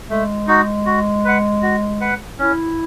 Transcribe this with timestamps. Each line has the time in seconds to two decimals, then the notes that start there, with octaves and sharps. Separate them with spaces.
0.10 G#3 A3
0.47 D#4 F#4
0.86 F#4
1.24 B4 F#5
1.63 F#4
2.01 B4 F#5
2.39 C#4 E4